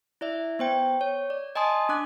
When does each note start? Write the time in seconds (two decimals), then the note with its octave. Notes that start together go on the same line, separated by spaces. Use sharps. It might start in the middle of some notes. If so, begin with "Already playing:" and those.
0.21 E4 D5 E5
0.59 B3 C5 G5
1.01 C#5
1.30 D5
1.55 D#5 G#5 A5 C6 D#6
1.89 D4 D6 F#6